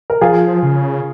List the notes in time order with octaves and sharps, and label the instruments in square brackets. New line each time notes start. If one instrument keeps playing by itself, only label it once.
[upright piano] A#4
[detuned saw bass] F3 [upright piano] F4 G#4
[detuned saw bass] C#3